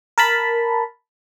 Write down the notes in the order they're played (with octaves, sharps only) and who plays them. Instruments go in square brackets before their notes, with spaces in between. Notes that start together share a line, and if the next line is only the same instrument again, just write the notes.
[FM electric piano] A#4 A5 B5